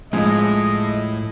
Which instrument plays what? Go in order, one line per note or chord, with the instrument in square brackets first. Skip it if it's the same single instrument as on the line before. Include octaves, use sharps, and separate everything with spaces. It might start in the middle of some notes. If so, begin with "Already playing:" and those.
[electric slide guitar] A2 [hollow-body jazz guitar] F3 [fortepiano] G#3 [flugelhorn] D#5